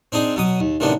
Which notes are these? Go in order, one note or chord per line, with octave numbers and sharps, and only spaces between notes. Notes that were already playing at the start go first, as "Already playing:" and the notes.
C4 D4 D#4 G#4
B2 F#3 D#6
D#2
A1 C3 D#3 B3 D4